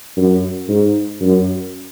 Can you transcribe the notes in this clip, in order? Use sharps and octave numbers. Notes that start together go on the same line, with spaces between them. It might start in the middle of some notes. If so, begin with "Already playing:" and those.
F#2
G#2
F#2